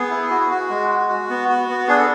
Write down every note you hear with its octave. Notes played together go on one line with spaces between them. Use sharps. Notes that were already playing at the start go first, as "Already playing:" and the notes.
Already playing: B3 G#4
E4
F#4
F#4
G#3
F#4
F#4
B3
F#4
B3
D4 G#4
A4